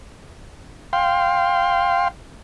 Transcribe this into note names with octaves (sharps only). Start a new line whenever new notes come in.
F5 G5 C6